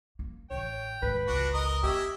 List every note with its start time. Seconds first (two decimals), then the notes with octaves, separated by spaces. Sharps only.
0.19 A#3
0.51 A1 E3 C#5 G5
1.02 D#2 G#2 B4
1.28 G1 C#2 D4 F#4
1.53 A#4 D#5 D#6
1.83 B3 C#4 G4 D#5 E5